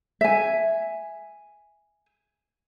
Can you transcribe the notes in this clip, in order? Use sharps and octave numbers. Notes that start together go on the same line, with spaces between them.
E5 G#5